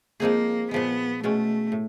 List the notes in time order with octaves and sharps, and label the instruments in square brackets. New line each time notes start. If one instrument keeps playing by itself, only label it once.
[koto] F3 G#3 C4 D#4 G#4 [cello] A#3
[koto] A#2 F3 G#3 [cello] B3
[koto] B2 G#3 C#4 [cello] A3
[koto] A2